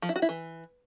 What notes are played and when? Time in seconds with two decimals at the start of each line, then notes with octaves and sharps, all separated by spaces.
0.02 F3
0.09 E4
0.16 F#4
0.22 E4
0.29 E3